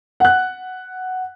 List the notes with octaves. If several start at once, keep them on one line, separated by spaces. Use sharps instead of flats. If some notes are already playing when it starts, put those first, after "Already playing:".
F#5 F#6